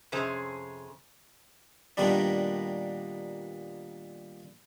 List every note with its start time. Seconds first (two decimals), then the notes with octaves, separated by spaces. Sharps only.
0.12 F2 C3 C#4 G#4 C5
1.97 A#2 D#3 G3 B3 D4